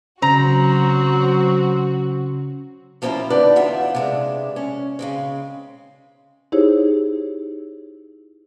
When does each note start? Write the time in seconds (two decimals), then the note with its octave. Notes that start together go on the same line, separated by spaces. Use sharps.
0.22 C#3 F#3 C4 C#4 F#4 A#5
3.02 F3 A#3 C4 C#4 E4 F4
3.30 D3 D4 D#4 B4 D5
3.56 E2 A2 F4 E5 F#5
3.95 C3 G#3 D4
4.56 C#4
4.99 C#3 G#3 C4
6.52 D#4 E4 G4 G#4 C5 C#5